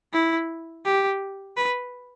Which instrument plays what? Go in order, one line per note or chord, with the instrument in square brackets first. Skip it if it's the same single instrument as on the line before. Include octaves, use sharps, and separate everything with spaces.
[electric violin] E4
G4
B4